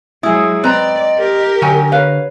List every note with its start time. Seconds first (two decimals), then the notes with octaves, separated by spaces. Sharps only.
0.23 F#3 G#3 E4 G#4 D#6
0.64 C4 B4 D5 D#5 A#5
1.18 G4 A#4
1.62 D3 F#3 D#4 G5 G#5
1.92 B4 C#5 F5